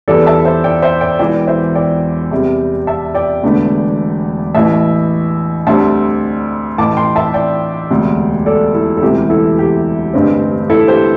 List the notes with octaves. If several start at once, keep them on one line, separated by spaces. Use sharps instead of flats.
E2 E3 G3 A4 D5
E5 A5
C5 E5
D5 G5
C5 E5
D5 G5
E1 E2 E3 D5 G5
C5 E5
D5 G5
E2 C3 G3
E5 A5
D5 G5
E1 E2 D3 A3
A1 A2 E3 E5 A5
D2 D3 G3 C4 E5 A5
A1 A2 E3 A5 D6
G5 C6
E5 A5
D5 G5
E1 D2 C3
A4 D5
E4 A4
A4
E1 D2 C3 E3 G4
E4 A4
G4
A1 G2 D3 C4
E4 A4
G4 C5